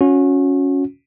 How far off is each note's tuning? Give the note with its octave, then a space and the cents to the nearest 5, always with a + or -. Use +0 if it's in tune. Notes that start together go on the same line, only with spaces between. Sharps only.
C#4 +0 F#4 -30